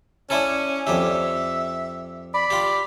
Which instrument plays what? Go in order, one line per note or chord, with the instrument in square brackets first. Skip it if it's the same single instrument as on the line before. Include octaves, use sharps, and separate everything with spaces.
[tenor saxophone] C#4 [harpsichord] D4 E4 A4
[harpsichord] F2 D4 G4 [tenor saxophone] E5
[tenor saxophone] D5 [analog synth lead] B5
[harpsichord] F4 G4